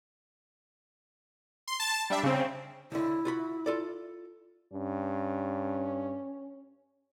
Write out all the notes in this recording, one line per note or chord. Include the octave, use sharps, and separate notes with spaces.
C6
A5 A6
G3 D4 E5
C#3 C4
C#2 D3 E4
F4 F#4 B5
F4 A4 D5
G2 C#4